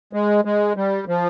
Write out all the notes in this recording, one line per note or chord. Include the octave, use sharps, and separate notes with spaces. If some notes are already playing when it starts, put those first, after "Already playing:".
G#3
G#3
G3
F3